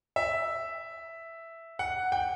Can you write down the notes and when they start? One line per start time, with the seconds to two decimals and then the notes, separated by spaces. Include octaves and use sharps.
0.16 E5
1.79 F#5
2.12 G5